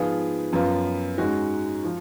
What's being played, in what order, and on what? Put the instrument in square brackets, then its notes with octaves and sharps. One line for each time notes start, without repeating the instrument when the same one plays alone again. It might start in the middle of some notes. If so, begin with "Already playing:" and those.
Already playing: [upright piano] G#2 F3 B3 F4 G#4
F#2 F3 B3 F4
G#2 G#3 C#4 F#4
F3